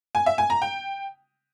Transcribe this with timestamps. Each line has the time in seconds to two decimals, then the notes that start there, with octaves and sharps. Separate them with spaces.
0.15 G#5
0.26 E5
0.38 G#5
0.50 A#5
0.62 G5